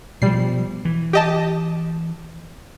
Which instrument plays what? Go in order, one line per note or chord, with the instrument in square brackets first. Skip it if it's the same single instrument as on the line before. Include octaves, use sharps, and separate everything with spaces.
[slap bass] B2 F3 [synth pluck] G3 C7
[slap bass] E3
[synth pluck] G4 D#5 A5